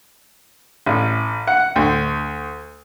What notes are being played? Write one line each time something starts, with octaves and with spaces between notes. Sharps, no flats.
A1
F#5
D2